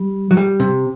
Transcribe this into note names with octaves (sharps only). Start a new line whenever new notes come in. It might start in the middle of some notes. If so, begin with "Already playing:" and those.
Already playing: G3
F#3
G3
C3